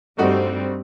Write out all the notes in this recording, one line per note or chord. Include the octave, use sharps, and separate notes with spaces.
G2 G3 A3 C4 D#4 F#4